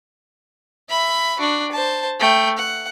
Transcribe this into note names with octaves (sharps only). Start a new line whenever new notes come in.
E5 B5
D4 F#4
C5 A5
A3 G5
F#5